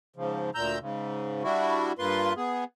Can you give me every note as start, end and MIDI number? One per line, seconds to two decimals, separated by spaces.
0.16 0.50 44
0.16 0.50 49
0.16 0.50 53
0.55 0.79 38
0.55 0.79 46
0.55 0.79 82
0.55 0.79 88
0.55 0.79 91
0.81 1.43 44
0.81 1.43 49
1.43 1.92 55
1.43 1.92 62
1.43 1.92 64
1.43 1.92 66
1.99 2.33 43
1.99 2.33 58
1.99 2.33 65
1.99 2.33 71
1.99 2.33 84
2.37 2.64 59
2.37 2.64 68